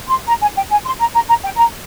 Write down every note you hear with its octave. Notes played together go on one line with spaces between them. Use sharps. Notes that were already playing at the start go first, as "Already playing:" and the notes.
C6
A#5
G#5
G5
G#5
C6
A#5
A#5
A#5
G5
A#5